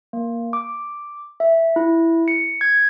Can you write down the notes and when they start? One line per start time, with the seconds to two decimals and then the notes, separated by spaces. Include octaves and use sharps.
0.13 A#3
0.53 D6
1.40 E5
1.76 E4
2.28 C#7
2.61 G#6